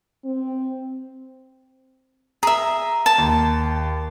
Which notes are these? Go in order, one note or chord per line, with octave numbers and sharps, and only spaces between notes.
C4
G#4 E5 A#5
A5
D#2